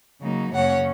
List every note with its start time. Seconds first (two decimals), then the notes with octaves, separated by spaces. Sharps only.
0.21 C#3 F#3 A#3 D#4
0.53 F#2 C#3 A#3 C#4 C#5 F#5